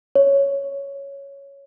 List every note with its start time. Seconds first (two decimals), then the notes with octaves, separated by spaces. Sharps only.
0.15 C#5